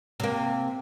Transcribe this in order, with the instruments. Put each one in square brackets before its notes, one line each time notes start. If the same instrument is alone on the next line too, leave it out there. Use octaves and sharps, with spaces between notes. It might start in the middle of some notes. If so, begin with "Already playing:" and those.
[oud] C3 A#3